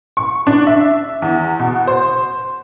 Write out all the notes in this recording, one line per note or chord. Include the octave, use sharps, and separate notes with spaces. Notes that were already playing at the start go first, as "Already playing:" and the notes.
C#6
D4
E5
E2
B2
C5